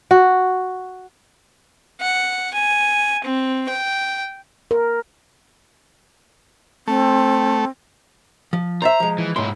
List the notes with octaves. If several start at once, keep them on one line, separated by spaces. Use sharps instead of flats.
F#4
F#5
G#5
C4
G5
A#4
A3 C4
F3
C5 D5 E5 A#5
F3 G#3
E3
B1 G#2 E4 C6